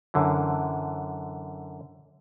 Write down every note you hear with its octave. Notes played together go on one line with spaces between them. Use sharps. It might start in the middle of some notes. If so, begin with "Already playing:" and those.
F#2 D3 E3